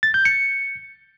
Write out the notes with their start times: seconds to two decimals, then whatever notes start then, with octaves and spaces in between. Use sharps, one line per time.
0.03 A6
0.14 G6
0.25 C#7